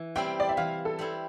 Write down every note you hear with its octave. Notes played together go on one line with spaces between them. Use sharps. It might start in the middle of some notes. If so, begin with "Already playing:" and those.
Already playing: E3
G3 C4 E4 G5
D5
E5
E3 F5
A4
G3 C4 E4